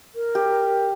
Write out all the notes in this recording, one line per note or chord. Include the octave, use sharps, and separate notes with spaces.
A#4
G4